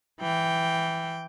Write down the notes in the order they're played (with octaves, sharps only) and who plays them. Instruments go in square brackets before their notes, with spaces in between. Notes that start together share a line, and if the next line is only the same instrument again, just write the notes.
[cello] E3 G5